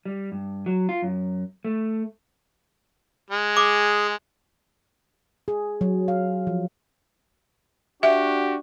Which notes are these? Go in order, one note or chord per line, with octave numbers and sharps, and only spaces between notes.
G3
G2
F#3
F4
F#2
A3
G#3
G#4 D6
G#4
F#3
F5
F3
D4 F#4 G4 E5